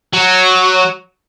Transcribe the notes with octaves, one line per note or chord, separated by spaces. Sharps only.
F#3